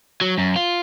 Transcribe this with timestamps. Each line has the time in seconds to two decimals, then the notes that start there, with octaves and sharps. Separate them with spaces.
0.21 F#3
0.38 F#2
0.56 F4